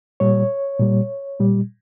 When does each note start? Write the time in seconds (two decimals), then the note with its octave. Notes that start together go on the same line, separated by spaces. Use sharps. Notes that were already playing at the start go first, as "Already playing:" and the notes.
0.20 A#2 G3 C#5
0.80 A#2 G3
1.39 A#2 G3